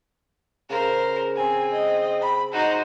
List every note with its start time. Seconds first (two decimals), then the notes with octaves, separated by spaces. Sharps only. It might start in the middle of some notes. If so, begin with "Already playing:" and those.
0.70 C#3 A#4 C5
1.36 C4 G#5
1.73 D#5
2.22 B5
2.53 D#4 F#4 C5